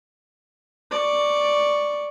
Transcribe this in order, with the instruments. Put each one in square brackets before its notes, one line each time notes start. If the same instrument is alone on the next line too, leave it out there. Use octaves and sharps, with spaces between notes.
[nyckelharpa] D5 C#6